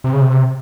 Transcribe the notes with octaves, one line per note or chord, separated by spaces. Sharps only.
C3
C#3
C3